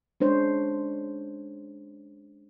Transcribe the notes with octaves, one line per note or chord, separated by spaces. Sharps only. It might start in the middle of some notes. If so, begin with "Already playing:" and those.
G#3 C#4 D4 C5 C#5